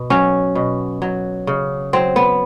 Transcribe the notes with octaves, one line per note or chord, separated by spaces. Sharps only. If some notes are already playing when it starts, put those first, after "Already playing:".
Already playing: B2
F#3 C#4
B2
F#3
C#3
F#3 C4
B3